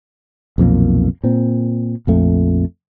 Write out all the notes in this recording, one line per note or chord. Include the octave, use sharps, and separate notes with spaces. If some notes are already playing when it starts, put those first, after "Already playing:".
B1 F2 A#2 A#3
A#2 C4
A#1 F2 A3